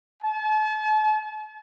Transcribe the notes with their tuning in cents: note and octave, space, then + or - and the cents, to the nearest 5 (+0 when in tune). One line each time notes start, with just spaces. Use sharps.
A5 -40